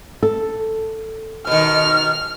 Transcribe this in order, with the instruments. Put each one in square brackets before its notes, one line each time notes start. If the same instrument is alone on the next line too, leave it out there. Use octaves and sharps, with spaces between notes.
[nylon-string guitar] A4
[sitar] B2 D#3 [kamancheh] F6